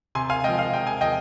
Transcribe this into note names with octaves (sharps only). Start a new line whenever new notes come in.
C3 G#5 C6
F5 G#5
F3 G#3 D#5 G5
F5
C3 G5
G#5
F3 D#5 G5